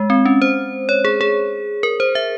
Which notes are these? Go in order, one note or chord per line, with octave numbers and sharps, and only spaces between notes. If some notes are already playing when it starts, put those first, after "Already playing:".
Already playing: G#3
C4
C#4
C5
C#5
G#4
G#4
A#4
C5
E5